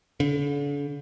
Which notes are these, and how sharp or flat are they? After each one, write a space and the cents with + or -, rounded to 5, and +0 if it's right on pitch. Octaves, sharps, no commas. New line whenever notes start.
D3 -40